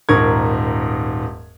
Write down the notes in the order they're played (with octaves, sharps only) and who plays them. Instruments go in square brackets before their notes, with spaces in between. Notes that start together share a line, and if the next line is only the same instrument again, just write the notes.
[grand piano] D#1 G#2 A#4 C#6 G#6